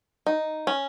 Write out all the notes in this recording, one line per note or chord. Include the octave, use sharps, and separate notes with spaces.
D#4
C#4